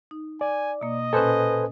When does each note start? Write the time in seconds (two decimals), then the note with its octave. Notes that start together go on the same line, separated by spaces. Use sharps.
0.11 D#4
0.41 D5 G#5
0.81 B2 A#3 D#5
1.13 A#2 C#4 A4 B4 C5 G#5